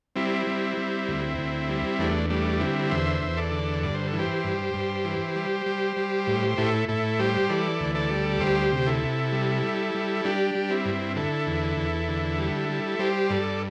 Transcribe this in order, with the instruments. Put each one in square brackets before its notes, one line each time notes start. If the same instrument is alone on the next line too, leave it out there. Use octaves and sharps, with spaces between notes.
[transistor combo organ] G3 C4 E4
G3
G3
D2
D2
G3
E2 A3 D4
G3 A3 D4
D3 C4 E4
E2 C5 E5
E2
A4 D5
D3
G2 D5
C5
A4
E3
G4 C5
G2
G2
E3
G3
G3
G3
A2
A2 E4 A4
A2 E4 A4
G3 G4 C5
E3 A4 D5
D2
A4 D5
G3
D2 G4 C5
C3
E4 A4
C3
G3
G3
G3
G3 D4 G4
G3
C4 E4
G2
D3 E4 A4
E2
E2
D3
G3
G3
G3 G4 C5
G2 A4 D5